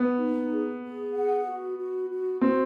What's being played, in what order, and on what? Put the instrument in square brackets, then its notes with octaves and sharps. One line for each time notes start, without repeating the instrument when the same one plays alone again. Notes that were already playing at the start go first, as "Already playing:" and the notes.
Already playing: [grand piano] B3
[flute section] D#4
G#4
G#4
F#5
F#4
F#4
F#4
[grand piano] C4 [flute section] F#4